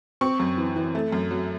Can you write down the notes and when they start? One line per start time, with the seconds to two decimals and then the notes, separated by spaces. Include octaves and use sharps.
0.21 C4 C#6
0.40 F#2
0.58 E3
0.76 E3
0.95 A3
1.12 F#2
1.31 F#3